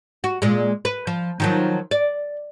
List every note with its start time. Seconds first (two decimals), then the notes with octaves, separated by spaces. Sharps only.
0.24 F#4
0.42 A#2 G#3
0.85 B4
1.07 F3
1.40 D#3 F3 F#3
1.91 D5